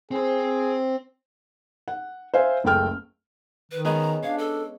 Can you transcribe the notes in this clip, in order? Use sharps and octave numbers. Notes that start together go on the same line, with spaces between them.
C4 G#4 C5
F#5
C5 E5 F5 G#5
F#1 C#2 A3 G5 F6
D#3 B4
G#3 B3 C#4 A#5
D4 C#5 F5
A4